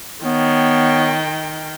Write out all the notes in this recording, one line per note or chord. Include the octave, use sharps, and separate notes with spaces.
D#3 B3 C#5 G5